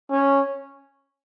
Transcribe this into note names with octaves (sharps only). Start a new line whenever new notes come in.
C#4